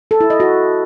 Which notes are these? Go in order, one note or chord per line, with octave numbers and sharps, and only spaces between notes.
A4
E4
D#5
F#4